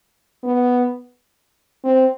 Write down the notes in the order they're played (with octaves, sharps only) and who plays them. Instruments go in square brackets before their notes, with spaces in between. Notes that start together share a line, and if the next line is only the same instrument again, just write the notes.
[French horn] B3
C4